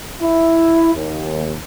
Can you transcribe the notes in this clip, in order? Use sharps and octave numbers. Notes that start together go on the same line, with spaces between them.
E4
D#2